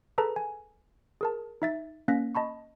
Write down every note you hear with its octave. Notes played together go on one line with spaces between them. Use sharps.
G#4 A4 B4 A5 A#5
G#5
G#4 A#4 A5
D#4 E5 A6
A#3 C#4 F#6 A#6 B6
D#5 A5 B5 C#6